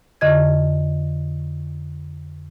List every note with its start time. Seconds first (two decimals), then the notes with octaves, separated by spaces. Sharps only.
0.21 F2 D3 D#5 G#6